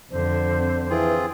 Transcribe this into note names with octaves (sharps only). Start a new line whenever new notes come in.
F2 D3 C5
C4
E3 C4 F4 G#4